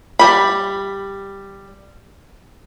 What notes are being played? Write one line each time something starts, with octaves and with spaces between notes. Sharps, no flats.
G3 B5